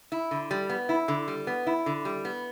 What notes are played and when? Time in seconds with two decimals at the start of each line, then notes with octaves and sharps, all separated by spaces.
0.12 E4
0.31 D3
0.51 G3
0.70 B3
0.89 E4
1.08 D3
1.28 G3
1.47 B3
1.67 E4
1.86 D3
2.05 G3
2.25 B3